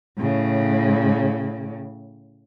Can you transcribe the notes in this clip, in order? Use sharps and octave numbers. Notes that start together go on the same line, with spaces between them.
A2 C#3